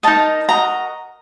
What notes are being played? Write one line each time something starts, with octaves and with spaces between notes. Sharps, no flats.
D#4 A#4 D#5 A5
F#4 A#4 D#5 A#5